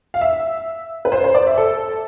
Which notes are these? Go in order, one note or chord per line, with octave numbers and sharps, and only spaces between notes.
F5
E5
B4
C5
C5
D5
E5
A4